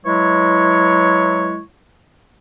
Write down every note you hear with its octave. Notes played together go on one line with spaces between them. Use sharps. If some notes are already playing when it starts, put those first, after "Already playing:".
E3 F#3 G#3 E4 C#5